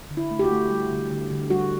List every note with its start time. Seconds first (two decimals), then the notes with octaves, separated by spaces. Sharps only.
0.10 D3
0.17 E4
0.31 A3
0.39 G4
0.44 F#4
0.51 A3
0.70 G3
0.91 D3
1.11 D3
1.31 D3
1.50 G3 F#4